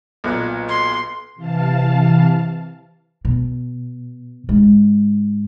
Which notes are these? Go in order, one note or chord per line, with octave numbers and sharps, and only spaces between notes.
B1 A#2 F#6
C6
C3 E3 F5 A5
B2
G#2